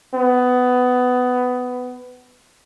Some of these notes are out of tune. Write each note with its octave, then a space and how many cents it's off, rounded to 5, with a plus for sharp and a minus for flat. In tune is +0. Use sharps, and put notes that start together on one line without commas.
B3 +15